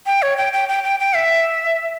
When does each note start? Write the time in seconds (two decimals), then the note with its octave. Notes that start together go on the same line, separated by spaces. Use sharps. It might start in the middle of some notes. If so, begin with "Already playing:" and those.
0.06 G5
0.22 C#5
0.37 G5
0.53 G5
0.69 G5
0.84 G5
1.00 G5
1.15 E5